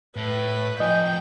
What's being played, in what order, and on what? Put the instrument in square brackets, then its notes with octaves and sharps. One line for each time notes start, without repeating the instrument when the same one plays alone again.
[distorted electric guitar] A2 [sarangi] B4
[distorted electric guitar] F2 G#5 [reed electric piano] D#5 [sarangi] G5